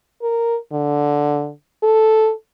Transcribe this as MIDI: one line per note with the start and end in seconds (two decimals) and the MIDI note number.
0.23 0.57 70
0.72 1.51 50
1.83 2.32 69